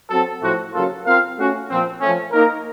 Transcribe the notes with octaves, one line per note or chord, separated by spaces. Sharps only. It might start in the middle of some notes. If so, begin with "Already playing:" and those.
F#3 C4 F#4 A4
A2 F3 A3 C4 F#4
C#3 F#3 A#3 F4 A4
C4 F4 A#4 F5
A3 C#4 F#4
A#2 F3 C4
F3 A3 C#4
A#3 D#4 A#4